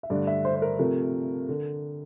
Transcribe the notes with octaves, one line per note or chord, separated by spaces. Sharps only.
E5
G2 D3 A3 D5
E5
C5
C5
A#4
C3 F3 A3 A#4
D3